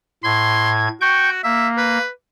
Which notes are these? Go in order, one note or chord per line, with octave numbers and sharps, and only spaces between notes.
A2 C6 G#6
F#4 G5 C#6 G6
A#3 E5
B4